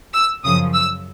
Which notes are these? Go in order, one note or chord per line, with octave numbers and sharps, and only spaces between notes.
E6
F#2 C#3 F3 D#6
E6